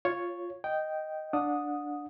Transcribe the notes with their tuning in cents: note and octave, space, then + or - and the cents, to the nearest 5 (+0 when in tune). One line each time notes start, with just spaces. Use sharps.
F4 +0 C#5 +0
D#5 +0 G5 -10
D4 +0 F#5 -30 D#6 +0